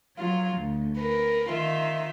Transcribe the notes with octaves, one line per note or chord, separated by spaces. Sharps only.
F#3 F4
D2
A#4 B4
D#3 F4 E5